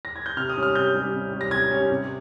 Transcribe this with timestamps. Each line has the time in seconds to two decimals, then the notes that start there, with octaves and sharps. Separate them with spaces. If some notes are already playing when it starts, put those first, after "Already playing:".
0.05 A#6
0.16 G#6
0.26 G6
0.37 C3 F6
0.49 D#6
0.57 G3 C#4
0.63 F6
0.75 C3 G6
0.94 G3 C#4
1.13 C3
1.33 G3 C#4
1.41 A#6
1.51 C3 G#6
1.71 G3 C#4
1.91 C3